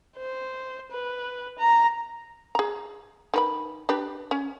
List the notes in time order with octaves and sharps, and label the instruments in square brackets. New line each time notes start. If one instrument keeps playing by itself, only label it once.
[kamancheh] C5
B4
A#5
[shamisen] G#4 A#5
D#3 B4 B5
D4 G4 B4
C#4